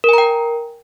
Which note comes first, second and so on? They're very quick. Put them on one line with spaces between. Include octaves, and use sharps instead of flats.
A#4 G#5 A#5 G5